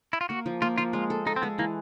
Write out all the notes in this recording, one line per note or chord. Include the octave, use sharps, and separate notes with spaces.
E4
F4
A#3 F#4
F3
A#3 F4
F3 F4
G#3 F4
A4
D#4 A4
C4
G#3 B3
E3 A#3